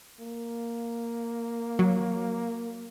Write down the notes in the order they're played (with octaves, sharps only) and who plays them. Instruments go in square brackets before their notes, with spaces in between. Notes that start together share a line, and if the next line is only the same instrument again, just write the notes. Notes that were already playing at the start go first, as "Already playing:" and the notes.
[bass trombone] A#3
[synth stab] F#3